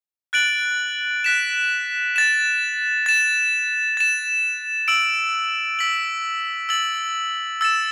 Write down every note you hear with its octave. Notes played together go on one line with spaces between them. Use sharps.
F#6 A6 D7 F#7
F#6 B6 E7
A6 E7
A6 E7
A6 E7
E6 D7 F#7
E6 B6 F#7
E6 A6 F#7
E6 A6 E7